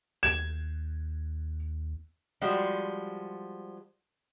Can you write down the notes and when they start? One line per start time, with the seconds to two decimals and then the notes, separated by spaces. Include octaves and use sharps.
0.23 D#2 G#6 E7
2.41 F3 G3 G#3 F#4